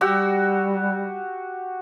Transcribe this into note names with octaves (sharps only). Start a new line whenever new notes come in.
G3 F#4 G4 E6